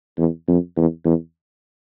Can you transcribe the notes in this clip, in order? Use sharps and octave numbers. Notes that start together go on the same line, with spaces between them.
E2
F2
E2
E2